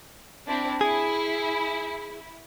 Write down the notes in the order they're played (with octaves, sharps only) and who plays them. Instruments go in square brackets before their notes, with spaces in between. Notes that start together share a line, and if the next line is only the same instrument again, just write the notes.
[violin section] C4 D4 E4
[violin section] E4 [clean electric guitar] G#4